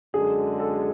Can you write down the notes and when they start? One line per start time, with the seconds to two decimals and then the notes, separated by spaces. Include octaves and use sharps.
0.14 F#2 D3 G#3 G#4
0.59 A4